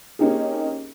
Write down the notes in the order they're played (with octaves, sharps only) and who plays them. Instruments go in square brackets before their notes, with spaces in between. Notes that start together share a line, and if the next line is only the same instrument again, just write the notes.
[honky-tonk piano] A#3 C4 C#4 D#4 G4 G#4